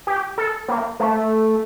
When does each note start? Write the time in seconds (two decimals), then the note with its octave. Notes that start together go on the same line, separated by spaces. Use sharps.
0.07 G4
0.38 A4
0.68 A#3
1.00 A3